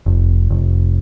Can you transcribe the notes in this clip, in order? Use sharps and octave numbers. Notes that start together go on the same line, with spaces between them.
F1
F1